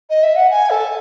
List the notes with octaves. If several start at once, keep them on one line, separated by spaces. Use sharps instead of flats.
D#5
E5
F#5
G#5
A4